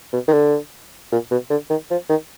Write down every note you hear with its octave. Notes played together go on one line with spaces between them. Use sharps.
B2
D#3
D3
A#2
B2
D3
D#3
F3
D#3